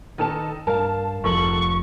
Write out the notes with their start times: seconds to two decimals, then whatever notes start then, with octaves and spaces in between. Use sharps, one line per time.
0.18 D#3 D#4 A4 B4 A5 E7
0.67 G2 A#4 F5 A5
1.24 F1 F2 G#2 A4 C#6 F#7